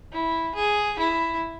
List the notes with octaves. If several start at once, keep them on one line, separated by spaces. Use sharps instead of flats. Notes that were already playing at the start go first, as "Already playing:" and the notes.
E4
G#4
E4